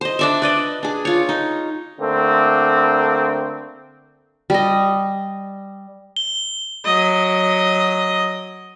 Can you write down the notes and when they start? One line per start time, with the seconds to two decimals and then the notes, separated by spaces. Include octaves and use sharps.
0.01 C5 D#5
0.19 D4 D5 E5
0.42 B4 D5 D#5
0.83 D4 G#4
1.05 F4 C#5
1.29 D#4
1.99 D3 A3 A#3 C4
4.50 G3 D#5
6.16 G7
6.85 F#3 D#5